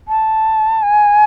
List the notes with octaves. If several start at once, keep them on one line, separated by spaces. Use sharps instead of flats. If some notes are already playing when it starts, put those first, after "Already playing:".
A5
G#5